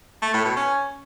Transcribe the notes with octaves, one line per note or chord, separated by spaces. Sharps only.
A3
A2
B2
C#4